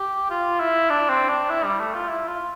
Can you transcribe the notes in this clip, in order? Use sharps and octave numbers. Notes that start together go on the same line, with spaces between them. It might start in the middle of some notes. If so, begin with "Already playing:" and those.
Already playing: G4
F4
E4
D4
C4
D4
E4
G3
A3
F4
E4
F4